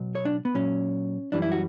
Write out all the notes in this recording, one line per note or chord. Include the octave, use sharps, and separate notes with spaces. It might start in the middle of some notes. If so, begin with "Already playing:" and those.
Already playing: B2 F#3
C#5
D4
B3
A#2 F#3 C#4
F#2 E3 G3 D4
E4
F#4